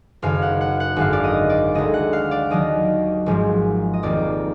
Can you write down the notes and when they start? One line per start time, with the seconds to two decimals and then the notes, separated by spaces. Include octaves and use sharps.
0.22 F#1 F#2 D#3 F5
0.42 F#5
0.61 F#5
0.80 F#5
0.96 G#1 F#2 D3 F5
1.13 D5
1.24 D#5
1.50 D5
1.75 D2 D3 G#3 D#5
1.94 F#5
2.13 F5
2.31 D5
2.50 D#2 D#3 F#3 D#5
3.26 G#1 G#2 F3 G#3
3.94 D#5
4.03 F1 F2 D#3 A#3 D5